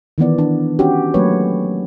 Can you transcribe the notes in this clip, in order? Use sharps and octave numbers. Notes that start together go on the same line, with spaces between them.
D#3 E3 B3 D5
D4
C#4 D4 F#4 G4
F#3 A3 A#3 B4 C#5